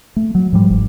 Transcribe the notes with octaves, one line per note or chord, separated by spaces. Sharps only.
A3
F#3
G#2 F3 G3
G1 G#2